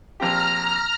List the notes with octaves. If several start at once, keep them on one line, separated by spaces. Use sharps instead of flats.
A#1 C4 G4 A#5 F6